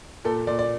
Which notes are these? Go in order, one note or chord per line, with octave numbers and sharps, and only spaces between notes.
A#2 A4
A#2 D5
D5